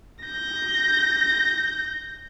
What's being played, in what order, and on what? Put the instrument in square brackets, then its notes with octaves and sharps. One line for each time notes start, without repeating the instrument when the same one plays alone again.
[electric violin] G6 A#6